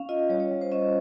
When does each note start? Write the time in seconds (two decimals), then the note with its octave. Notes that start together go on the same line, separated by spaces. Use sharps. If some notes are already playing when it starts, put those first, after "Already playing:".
Already playing: C#4 F5
0.09 F4 D#5
0.29 G3 C#5
0.40 C#5
0.51 G3
0.61 C5
0.72 C#4 D#5